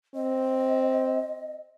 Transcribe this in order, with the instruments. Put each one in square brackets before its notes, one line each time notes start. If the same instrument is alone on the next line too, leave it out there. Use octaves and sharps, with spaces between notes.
[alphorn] C4 [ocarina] D#5